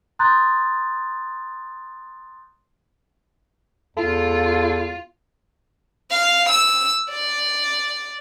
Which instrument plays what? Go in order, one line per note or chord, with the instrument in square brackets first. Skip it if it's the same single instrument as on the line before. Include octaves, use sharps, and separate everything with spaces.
[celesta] A#5 C6 D#6 F#6 G6 A6
[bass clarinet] E2 [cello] F4 [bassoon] A4
[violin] F5
E6
D5